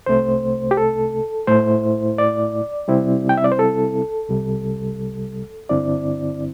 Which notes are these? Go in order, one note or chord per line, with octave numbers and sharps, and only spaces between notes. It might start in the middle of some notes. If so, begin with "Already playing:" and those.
C2 C3 A3 C5
G4
A4
A2 A3 E4 C5
D5
C3 G3 C4 E4
G5
E5
D5
C5
A4
C2 C3 G3
G2 D3 C4 E4 D5